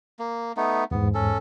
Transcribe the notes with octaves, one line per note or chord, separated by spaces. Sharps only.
A#3
A3 B3 D#4
E2 G#2 B3
C#4 A4